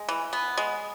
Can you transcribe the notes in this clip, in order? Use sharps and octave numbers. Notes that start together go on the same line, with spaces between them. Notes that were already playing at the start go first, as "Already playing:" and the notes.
Already playing: G#3
E3
B3
G#3